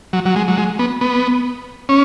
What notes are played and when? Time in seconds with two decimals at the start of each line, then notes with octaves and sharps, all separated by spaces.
0.13 F#3
0.26 F#3
0.36 G#3
0.48 F#3
0.58 G#3
0.79 B3
1.01 B3
1.89 C#4